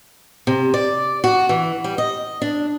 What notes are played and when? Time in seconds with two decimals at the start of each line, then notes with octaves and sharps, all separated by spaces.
0.47 C3
0.74 D5
1.24 F#4
1.49 E3
1.84 G3
1.98 D#5
2.42 D4